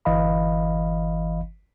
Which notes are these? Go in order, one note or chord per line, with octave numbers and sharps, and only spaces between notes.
G1 E3 D#5 F5 B5